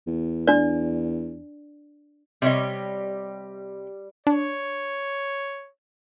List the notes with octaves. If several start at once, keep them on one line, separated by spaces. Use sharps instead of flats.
E2
D4 D5
C3 G3 C#5 D#5
D4 C#5